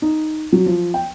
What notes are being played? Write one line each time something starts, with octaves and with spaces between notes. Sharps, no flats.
D#4
F#3
F3
G5